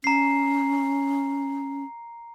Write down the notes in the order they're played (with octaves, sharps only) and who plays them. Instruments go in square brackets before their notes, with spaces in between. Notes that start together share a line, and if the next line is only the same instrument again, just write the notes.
[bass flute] C#4 [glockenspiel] A#5 C7